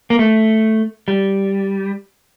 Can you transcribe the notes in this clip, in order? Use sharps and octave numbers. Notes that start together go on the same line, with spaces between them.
A#3
A3
G3